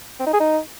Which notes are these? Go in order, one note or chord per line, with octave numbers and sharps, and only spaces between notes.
C4
D#4
G#4
D#4